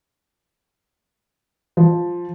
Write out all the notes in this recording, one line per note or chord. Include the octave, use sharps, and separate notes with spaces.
F3